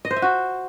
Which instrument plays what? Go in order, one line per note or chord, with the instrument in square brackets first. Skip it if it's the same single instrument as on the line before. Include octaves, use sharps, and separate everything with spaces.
[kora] D#5
C5
E5
F#4